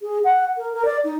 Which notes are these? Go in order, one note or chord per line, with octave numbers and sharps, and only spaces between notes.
G#4
F#5
A#4
A#4
D5
D#4